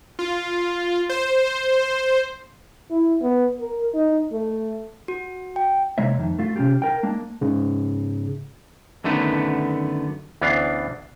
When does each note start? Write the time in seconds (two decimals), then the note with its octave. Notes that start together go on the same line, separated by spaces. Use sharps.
0.19 F4
1.09 C5
2.91 E4
3.22 B3
3.60 A#4
3.94 D#4
4.32 A3
5.08 F#4
5.56 G5
5.98 C3 G#3 A#3 C#5 E5
6.17 F2 D#3
6.39 A3 F4
6.56 C3 C#4 D#4 F4 G4
6.82 A#4 G5
7.03 G#3 A#3 D4
7.41 G#2 C#3
9.04 F#2 D3 D#3 A3 B3
10.42 D2 E3 B3 C#4 D4 F5